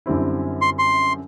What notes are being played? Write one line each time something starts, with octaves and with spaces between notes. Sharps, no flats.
F#2 D3 G3 C4 E4
C6
C6